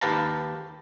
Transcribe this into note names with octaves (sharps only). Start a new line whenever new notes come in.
D#2 G4 B4 F5 A5 A#5